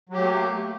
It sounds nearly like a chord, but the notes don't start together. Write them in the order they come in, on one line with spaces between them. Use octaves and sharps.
F#3 G4 A3 A#3